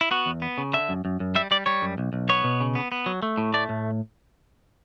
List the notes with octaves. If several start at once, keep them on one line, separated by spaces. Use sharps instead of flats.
E4
B3 F#4
E2
B3
C#3
D3 E5
F#2
F#2
F#2
G3 E5
G3 D5
G3 C#5
F#2
B1
B1
B3 C#5
B2
C#3
B3
B3
F#3
A3
A2
A3 D5
A2